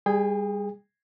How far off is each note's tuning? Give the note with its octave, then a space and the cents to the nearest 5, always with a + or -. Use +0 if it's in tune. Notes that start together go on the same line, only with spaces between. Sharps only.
G3 +25 G#4 +0 G5 +40